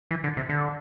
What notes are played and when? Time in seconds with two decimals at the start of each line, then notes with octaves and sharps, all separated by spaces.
0.11 E3
0.24 D3
0.37 C3
0.49 D3